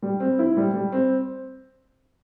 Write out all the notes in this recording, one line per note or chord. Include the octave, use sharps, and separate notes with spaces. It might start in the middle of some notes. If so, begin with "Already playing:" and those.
G3
C4
E4
G3
G3
C4